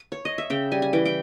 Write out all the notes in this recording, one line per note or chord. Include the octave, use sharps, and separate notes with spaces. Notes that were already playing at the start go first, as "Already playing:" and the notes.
Already playing: B4
C#5
D#5
E5
C#3 G5
G3 G#5
G#5
E3 G5
G5